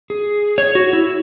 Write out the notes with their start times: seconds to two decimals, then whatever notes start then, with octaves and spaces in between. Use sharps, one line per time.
0.10 G#4
0.58 C#5
0.75 F#4
0.93 E4